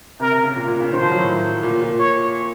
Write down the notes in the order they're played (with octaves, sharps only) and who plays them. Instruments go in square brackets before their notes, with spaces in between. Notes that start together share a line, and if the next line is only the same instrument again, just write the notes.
[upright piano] C3 [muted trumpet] A#4
[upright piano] C3
C#3
A#2
A#2
C#3
[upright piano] D#3 [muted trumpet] C5
[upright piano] F3
F#3
A2
A#2
A#2
[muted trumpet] C#5